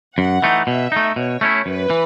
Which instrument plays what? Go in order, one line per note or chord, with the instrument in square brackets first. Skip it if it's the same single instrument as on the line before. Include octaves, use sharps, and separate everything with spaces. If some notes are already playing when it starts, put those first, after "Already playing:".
[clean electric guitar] F#2 [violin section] F#5
[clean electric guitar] E3 A3 D#4
[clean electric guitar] B2 [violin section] E5
[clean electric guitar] A3 D#4
[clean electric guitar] B2 [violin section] C#5
[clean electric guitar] A3 C#4 E4
[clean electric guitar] F#2 [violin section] B4
[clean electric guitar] E3